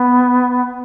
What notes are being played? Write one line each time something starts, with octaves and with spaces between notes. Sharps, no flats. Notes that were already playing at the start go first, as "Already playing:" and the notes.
Already playing: B3